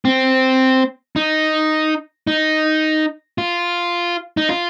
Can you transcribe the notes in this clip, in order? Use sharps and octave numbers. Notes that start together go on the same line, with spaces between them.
C4
D#4
D#4
F4
D#4
F4